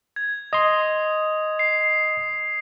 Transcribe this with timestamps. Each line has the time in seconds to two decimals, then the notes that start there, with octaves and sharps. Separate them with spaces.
0.16 G#6
0.53 D#5 C6 D#6
1.59 C7